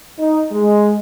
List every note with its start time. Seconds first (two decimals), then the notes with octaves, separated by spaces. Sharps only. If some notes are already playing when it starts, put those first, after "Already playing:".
0.19 D#4
0.52 G#3